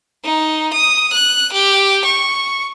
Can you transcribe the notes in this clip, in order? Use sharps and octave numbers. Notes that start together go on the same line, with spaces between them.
D#4
D#6
F#6
G4
C#6